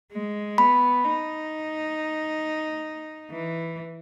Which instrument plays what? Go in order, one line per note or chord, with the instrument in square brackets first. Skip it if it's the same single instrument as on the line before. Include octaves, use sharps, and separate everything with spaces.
[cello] G#3
[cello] B3 [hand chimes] B5
[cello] D#4
E3